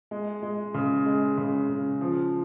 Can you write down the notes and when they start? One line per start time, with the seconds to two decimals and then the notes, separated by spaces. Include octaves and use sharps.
0.11 G#3
0.42 G#3
0.74 C#3
1.06 G#3
1.37 C#3
1.69 C#3
2.01 F3